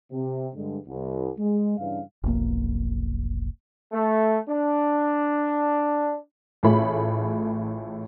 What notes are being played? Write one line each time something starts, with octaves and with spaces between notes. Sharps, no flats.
C3
G2 D3 G#3
C2
G#3
G2 C#3 E3 D4 F5
F1 B1 A#3
A3
D4
A1 A2 A3 F4 G#4 B5